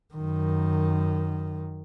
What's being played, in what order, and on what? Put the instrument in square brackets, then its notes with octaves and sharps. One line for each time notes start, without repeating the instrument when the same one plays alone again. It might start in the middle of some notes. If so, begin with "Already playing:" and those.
[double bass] F#2 D#3